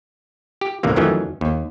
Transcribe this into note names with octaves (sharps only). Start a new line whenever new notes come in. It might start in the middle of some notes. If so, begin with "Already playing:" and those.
G4
D2 A2 C3 E3 A#3
F2 D#3 E3 F#3 A3 C#4
D#2